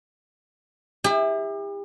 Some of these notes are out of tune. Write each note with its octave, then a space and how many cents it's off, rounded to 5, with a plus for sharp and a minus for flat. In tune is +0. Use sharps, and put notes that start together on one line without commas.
E4 -15 G4 +40